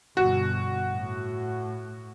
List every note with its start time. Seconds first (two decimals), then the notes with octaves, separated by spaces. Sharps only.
0.17 G1 B2 F#4
0.93 A2